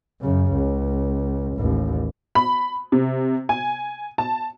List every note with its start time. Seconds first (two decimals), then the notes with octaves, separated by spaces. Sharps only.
0.20 F#2 C#3
0.53 C#2
1.56 A1 D#2
2.35 B5
2.92 C3
3.49 G#5
4.18 A5